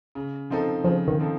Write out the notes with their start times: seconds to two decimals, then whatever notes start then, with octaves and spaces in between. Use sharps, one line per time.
0.15 C#3
0.50 F3 C4 D#4 A4
0.84 C#3 F3
1.08 D#3
1.20 F3 C4 D#4 A4